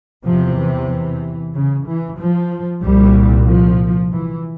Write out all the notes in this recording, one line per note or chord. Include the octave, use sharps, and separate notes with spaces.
E2 C3 F3
E3
E3
C#3
E3
F3
C2 A#2 G3
F3
E3